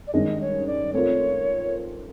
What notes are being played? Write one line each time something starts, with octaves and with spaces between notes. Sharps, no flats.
D5
G2 D#3 G#3 C#4 D#5
C#5
D5
A3 C4 F4 A#4 C#5